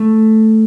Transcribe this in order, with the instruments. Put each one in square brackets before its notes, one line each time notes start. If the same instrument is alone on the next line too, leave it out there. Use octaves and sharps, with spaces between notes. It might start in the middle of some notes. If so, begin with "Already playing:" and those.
Already playing: [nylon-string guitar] A3